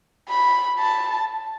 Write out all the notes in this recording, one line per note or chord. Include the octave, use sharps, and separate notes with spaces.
B5
A5